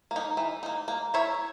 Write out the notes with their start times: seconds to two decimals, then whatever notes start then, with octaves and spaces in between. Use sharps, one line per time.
0.11 A#3
0.16 D#4
0.37 E3
0.63 A#3 D#4
0.88 A#3
1.14 E4 A#4 C#5 E5